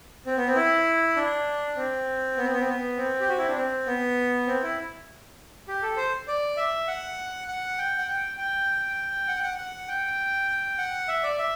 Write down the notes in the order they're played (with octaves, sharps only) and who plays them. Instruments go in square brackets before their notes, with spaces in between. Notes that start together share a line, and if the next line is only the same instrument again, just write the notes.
[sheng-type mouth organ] C4
B3
C4
E4
D4
C4
B3
C4
B3
C4
B3
C4
G4
F#4
E4
D4
C4
B3
C4
E4
G4
A4
C5
D5
E5
F#5
F#5
G5
F#5
G5
G5
F#5
G5
F#5
F#5
G5
F#5
E5
D5
E5